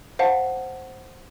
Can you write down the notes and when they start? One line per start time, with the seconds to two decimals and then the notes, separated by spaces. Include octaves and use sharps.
0.19 C5 F5 F#5 A5